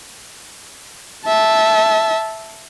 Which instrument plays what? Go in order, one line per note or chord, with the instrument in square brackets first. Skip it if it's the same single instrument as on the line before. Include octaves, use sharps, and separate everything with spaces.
[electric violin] E5 A5